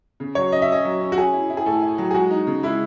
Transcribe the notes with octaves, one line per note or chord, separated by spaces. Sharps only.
C#3
F#3 C#5
C#4 D#5
E5
C#4 D#5
F#3
C#4
F#4
C#4 G#4
E4
E4
G#4
A2 A4
E4
F#3
G#4
G#3 F#4
D#4
C#3
G#3 E4